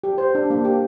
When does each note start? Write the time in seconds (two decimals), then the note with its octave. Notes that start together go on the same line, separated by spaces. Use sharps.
0.04 G4
0.18 C5
0.35 D4
0.50 A#3
0.65 G4